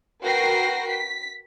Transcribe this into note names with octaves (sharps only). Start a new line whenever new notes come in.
F#4 A#4 B4 G5 A#6 C7
B6